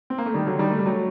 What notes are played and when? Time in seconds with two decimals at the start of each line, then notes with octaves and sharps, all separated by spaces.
0.10 C4
0.18 A#3
0.26 A3
0.34 D#3 G3
0.47 D3 F#3
0.59 D#3 G3
0.72 A3
0.79 G3
0.86 F#3 A3